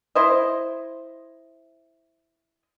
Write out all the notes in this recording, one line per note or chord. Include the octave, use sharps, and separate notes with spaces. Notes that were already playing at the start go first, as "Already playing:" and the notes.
E4 C5 D#5